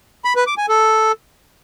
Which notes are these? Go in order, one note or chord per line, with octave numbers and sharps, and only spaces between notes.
B5
B4
D6
G#5
A4